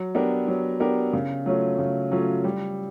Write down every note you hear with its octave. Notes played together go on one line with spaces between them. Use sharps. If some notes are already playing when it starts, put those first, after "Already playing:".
Already playing: F#3
B3 D4 G4 A#4
F#3
B3 D4 G4 A#4
C#3
F#3 A3 C#4 F4
C#3
F#3 A3 C#4 F4
G3